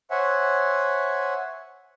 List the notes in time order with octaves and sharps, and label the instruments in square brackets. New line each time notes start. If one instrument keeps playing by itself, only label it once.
[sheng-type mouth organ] C5 C#5 E5 F#5 G#5